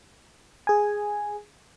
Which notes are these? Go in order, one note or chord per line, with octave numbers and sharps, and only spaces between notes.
G#4 G#5